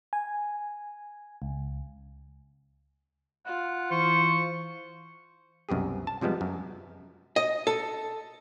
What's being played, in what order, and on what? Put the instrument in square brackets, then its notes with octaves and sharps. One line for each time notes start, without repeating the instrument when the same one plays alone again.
[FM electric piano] G#5
C#2
[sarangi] F4 [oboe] F#5
[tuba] E3 [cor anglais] C5 [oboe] C#6
[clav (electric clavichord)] C2 F#2 B2 G4 G#4
A5
C3 F3 G3 G#3 B3
F#2
[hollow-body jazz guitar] D#5
A4